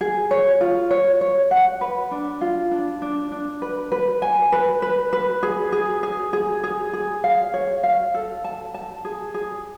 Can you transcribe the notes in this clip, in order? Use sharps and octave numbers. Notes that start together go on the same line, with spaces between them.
G#4
C#5
F4
C#5
C#5
F#5
B4
D4
F4
D4
D4
D4
B4
B4
G#5
B4
B4
B4
G#4
G#4
G#4
G#4
G#4
G#4
F5
C#5
F5
A4
A5
A5
G#4
G#4